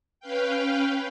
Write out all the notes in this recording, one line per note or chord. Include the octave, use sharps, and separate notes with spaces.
C#4 B4 F5 G5